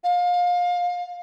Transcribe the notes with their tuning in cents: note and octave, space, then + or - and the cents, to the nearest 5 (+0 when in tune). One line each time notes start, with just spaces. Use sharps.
F5 +25